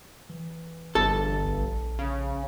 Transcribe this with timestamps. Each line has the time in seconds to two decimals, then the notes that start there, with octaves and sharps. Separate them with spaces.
0.29 E3
0.95 G1 A4
1.45 A#1
1.99 C#3